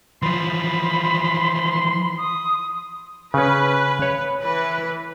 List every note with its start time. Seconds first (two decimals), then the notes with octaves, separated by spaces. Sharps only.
0.22 E3 F3 B5 C6
2.17 D#6
3.34 C#3 C#4 B4
4.02 C#5
4.40 E3 B4